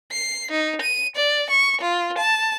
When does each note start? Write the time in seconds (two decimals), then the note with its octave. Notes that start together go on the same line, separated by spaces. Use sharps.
0.11 C7
0.51 D#4
0.81 D#7
1.16 D5
1.50 C#6
1.81 F4
2.18 A5